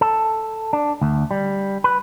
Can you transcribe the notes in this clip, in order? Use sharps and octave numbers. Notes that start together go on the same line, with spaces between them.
A4
D4
D2
G3
B4